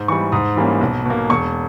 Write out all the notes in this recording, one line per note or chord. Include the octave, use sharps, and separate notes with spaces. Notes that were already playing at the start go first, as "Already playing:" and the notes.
Already playing: G#2
E3 G3 C#6
G#2 D#6
E3 G3 A#3 C#4
B1
B2 A#3
E1 C#6